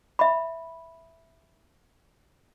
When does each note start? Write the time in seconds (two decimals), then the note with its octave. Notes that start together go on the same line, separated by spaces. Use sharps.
0.19 E5 B5